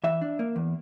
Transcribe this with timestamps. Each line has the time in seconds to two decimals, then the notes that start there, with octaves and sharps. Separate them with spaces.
0.04 E3 E5
0.21 D4
0.39 A#3
0.56 E2